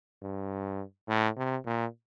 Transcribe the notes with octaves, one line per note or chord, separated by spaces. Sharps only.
G2
A2
C3
A#2